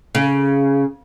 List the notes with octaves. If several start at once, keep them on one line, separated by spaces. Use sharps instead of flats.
C#3